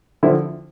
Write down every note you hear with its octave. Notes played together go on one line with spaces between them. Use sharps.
D3 F3 C4 E4